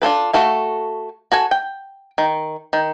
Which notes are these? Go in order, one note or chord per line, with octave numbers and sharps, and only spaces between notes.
D4 F4 A4 B4
A3 F#4 A4 F5
F#4 A4 G#5
G5
D#3
D#3